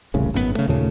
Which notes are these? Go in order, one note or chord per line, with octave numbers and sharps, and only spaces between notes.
E1 C2 A2 C#3
G#1 F#2 A2 B3
C#3 A3
D#2 A#2 C#3 A3